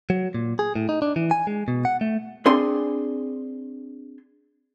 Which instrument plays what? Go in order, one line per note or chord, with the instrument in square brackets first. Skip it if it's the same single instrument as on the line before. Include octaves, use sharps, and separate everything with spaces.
[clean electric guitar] F#3
A#2
G#4
A2
D#4
D4
E3
G#5
G#3
B2
F#5
A3
[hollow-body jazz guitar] C4 D4 G#4 G#5 C6